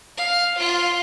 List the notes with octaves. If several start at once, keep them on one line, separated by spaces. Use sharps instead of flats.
F5
F4